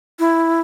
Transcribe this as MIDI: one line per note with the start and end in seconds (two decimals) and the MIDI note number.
0.19 0.61 64